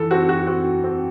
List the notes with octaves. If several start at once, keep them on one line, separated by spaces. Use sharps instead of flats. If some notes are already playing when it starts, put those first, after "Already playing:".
Already playing: E3 A4
C4 F#4
F#4
C4 F#4
C4